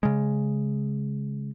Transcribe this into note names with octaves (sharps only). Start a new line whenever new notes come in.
C#3 G#3